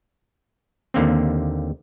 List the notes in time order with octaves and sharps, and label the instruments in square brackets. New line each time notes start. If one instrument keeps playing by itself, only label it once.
[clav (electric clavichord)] D#2 D3 A#3 C4